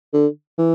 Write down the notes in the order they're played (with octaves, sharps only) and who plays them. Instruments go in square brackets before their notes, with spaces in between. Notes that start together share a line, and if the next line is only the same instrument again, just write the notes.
[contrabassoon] D3
E3